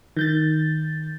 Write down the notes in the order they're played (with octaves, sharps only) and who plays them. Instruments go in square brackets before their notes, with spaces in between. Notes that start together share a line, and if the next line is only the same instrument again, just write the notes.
[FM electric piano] D#3 G6 A6